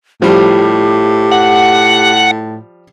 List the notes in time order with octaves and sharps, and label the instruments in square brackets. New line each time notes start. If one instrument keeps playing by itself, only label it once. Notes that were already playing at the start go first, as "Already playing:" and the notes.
[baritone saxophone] A2 [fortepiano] F3 G3 [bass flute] G4
[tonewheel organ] F#5